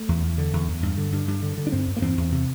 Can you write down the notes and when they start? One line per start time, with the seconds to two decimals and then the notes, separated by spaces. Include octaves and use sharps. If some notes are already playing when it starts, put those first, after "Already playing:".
Already playing: A3
0.09 E2
0.23 E2
0.38 D3
0.53 E2
0.68 E2
0.83 G2
0.98 D3
1.12 G2
1.28 G2
1.43 D3
1.58 D3
1.67 D4
1.72 G2 C4
1.87 G2
1.96 A#3
2.02 E2 C4
2.17 E2
2.32 C3